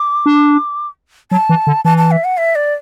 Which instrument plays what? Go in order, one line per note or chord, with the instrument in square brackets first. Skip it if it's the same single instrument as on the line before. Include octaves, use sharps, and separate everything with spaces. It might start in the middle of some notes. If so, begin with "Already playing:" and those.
Already playing: [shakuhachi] D6
[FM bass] D4
[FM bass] F#3 [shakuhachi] A5
[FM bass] E3
D3
[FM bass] E3 [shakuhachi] A5
[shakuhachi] A5
E5
F#5
E5
D5